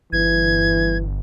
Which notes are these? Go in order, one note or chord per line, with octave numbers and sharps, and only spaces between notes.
G1 E3 G#6